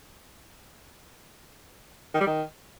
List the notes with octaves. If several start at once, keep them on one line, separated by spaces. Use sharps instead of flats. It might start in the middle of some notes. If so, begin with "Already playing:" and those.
D#3
G3
D#3